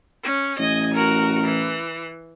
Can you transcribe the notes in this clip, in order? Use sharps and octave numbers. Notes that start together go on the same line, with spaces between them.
C#4
A1 D#5 G#5
F#4 A#4
E3